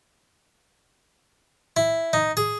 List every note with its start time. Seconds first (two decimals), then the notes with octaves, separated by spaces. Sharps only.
1.77 E4
2.13 D#4
2.37 G#4